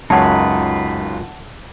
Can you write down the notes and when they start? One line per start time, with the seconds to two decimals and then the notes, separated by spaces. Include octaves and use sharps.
0.10 C#2 F#2 D#4 F4 B4 C#5 F#5 A5